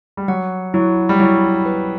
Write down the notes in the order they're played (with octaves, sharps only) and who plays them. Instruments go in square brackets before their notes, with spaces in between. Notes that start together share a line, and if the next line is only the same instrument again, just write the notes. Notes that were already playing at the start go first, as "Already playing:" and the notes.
[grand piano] G3
[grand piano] F#3 [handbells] F#5
[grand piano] F#3 [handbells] E4
[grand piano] G3
[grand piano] F#3 [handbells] E4
[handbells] B4